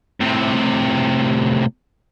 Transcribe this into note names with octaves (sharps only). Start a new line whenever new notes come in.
A2 C3